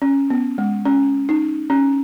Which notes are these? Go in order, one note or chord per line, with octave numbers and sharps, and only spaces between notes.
C#4
B3
G#3
C#4
D#4
C#4